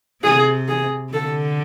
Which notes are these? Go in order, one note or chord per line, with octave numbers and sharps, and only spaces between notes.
C3 G#4
G#4
D3 A4